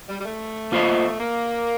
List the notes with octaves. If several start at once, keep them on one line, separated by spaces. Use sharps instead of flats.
G3
G3
A3
A#3 F4 C5 D#5
A#3